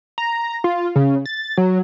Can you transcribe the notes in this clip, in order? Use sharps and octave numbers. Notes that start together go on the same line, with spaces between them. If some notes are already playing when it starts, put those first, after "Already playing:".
A#5
F4
C#3
A6
F#3